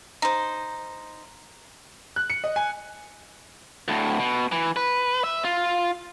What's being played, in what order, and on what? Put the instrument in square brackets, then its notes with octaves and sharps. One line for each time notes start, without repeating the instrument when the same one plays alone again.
[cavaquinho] D#4 C5
[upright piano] F#6
C#7
D#5
G#5
[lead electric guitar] D2 A2
B2
E3
B4
E5
F4